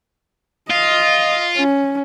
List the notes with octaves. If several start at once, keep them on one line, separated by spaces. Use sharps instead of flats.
F4 D#5
C#4